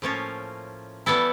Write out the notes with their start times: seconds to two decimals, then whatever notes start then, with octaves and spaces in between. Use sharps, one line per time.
0.02 A2 F3 A#3 C#4 F4
1.06 E3 G3 B3 E4 A4